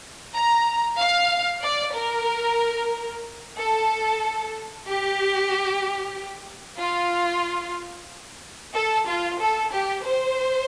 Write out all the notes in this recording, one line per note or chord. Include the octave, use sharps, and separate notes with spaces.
A#5
F5
D5
A#4
A4
G4
F4
A4
F4
A4
G4
C5